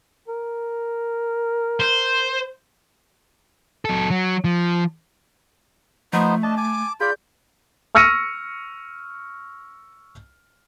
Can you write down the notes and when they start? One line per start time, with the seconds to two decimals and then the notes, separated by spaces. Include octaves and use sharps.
0.28 A#4
1.80 C5
3.85 F#3 A4
4.10 F#3
4.44 F3
6.13 F3 A3 B3 D#4 C5
6.43 D4 D#5 A5
6.57 G#5 D6
7.00 F4 G#4 D5 B5 G6
7.95 C#6 E6 F6 A#6 C#7 D#7